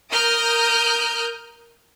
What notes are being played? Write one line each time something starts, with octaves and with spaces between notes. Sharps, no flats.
A#4 D#6 F6 G6